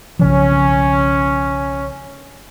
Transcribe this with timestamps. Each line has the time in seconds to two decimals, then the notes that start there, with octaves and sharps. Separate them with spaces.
0.19 B1 C#3 F3 C#4